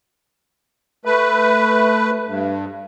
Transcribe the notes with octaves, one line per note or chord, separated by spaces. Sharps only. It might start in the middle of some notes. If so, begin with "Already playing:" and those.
A3 B4
G2